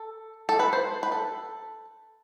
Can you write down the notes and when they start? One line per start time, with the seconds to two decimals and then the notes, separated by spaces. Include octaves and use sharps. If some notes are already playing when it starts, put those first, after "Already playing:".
Already playing: A4
0.49 A4
0.59 B4
0.73 C5
1.03 B4
1.12 A4